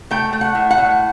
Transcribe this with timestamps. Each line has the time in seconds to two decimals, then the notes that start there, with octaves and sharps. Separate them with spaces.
0.11 A3 G5
0.33 A3
0.41 F#5
0.55 A2
0.70 F#5
0.78 A2